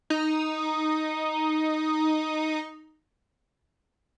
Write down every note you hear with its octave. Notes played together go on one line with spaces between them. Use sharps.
D#4